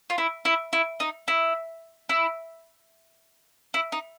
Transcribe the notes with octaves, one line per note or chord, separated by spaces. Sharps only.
F4
E4
E4
E4
D#4
E4
E4
E4
D#4